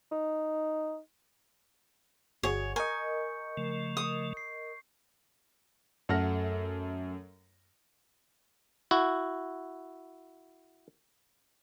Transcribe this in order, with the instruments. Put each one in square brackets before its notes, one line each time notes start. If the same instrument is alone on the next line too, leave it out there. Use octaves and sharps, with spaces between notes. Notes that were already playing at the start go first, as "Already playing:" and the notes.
[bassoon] D#4
[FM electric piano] G1 F#4 G#4 [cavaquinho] C#5
[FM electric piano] A#4 D#5 [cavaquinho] G#5 [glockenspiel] C#6 G6 C#7
[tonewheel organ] C#3 F3 A3
[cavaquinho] D#6
[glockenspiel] C7
[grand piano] F#2 A3 A4 F#5 F6 A#6
[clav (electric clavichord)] E4 F#4